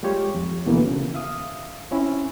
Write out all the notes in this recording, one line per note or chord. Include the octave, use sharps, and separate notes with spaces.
G3 G#3 F4 G4 C#5
F2
D2 B2 D3 E3 A#3 B3
C#3
E5 F5 D#6
C4 C#4 E4